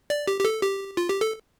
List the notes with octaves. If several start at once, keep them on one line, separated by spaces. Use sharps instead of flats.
D5
G4
G4
A4
G4
F4
G4
A4